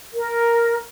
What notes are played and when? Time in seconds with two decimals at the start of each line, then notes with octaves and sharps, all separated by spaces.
0.14 A#4